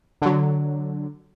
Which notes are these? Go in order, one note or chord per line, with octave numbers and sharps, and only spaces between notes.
D3 F#3